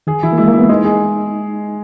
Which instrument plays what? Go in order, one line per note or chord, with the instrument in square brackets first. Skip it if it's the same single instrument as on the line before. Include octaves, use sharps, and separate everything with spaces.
[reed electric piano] D#3 [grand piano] G#4
[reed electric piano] E3 [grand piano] E4
[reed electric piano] A#3
[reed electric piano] G#3 [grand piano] E4
[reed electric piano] A#3
[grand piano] E4
[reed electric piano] B3
[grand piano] G#3 [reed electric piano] D#4
[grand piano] G#4